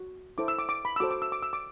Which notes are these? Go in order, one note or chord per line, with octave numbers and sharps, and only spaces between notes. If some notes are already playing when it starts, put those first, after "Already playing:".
Already playing: F#4
E4 A4 C5 D6
E6
D6
D6
B5
E6
F#4 A4 C5 D6
D6
E6
D6
E6
D6